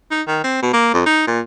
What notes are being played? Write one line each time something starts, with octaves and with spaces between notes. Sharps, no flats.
D#4
D#3
C4
B2
A#3
F2
D#4
A#2